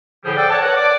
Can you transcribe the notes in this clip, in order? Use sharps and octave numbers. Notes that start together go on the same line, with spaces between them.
A2 D3 F3 G3 G4 G#4
A4 C5 D5 F#5 G5
A4 C#5 D5 F#5 A5
A#4 B4 C#5 D5 F#5
D5 D6